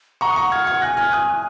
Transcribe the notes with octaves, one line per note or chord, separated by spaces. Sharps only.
F#5 A#5 C#6
D#6
A#5 C#6
F6 G#6
F6 G#6
G#5 F#6 A#6
F6 G#6
D#6 F#6